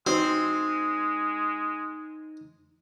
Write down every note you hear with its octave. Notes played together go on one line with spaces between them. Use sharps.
G#3 C4 D#4 F#4